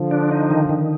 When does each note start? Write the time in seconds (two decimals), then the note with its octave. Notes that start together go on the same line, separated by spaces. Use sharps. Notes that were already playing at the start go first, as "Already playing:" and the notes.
Already playing: D3 F3
0.11 D4
0.31 D#4
0.50 D#3
0.69 D#3